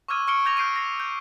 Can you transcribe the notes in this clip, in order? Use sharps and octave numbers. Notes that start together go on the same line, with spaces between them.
C#6 D6 E6 F6 G#6 D#7
C#6 F6 C#7 D7 G7
D6 G6 G#6 A#6 F7 G7
F6 G6 C7 D7 D#7
A#6 C7
G6